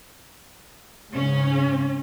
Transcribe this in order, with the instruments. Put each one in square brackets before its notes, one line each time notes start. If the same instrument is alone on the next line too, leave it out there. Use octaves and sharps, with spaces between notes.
[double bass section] G#2 C#3 [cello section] C#4